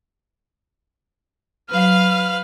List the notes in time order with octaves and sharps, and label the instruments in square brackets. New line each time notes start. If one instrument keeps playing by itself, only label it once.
[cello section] F#3 [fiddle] B4 F5 [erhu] F6